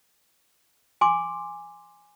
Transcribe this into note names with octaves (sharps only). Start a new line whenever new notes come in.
G#5 C6 D6